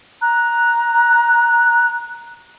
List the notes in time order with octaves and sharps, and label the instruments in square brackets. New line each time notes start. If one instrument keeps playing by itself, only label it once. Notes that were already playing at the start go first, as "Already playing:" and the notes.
[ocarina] A#5 [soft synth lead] F#6